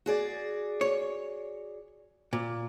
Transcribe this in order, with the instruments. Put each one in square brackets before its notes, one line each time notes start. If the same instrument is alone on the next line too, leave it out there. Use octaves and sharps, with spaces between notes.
[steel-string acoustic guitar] F#4 G#4 D5
[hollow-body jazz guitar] C#5
A#2